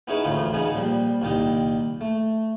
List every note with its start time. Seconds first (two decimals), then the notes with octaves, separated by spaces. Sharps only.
0.08 B3 C#4 D#4 E4 G#4 B4
0.24 A1 D2 A2 F4 B5
0.53 C#3 B3 D#4 G#4
0.74 A#2 F3 G3
1.22 C2 A#2 D#3 G4 D#5
2.01 A3